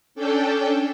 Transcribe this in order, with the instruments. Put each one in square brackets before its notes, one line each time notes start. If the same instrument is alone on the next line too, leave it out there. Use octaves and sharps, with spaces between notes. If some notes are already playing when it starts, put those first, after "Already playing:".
[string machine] C#4 D4 A4 G5